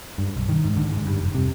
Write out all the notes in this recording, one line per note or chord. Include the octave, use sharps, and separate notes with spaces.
G2
B1
D#3
G#2
D3
G#2
G2
F1
C3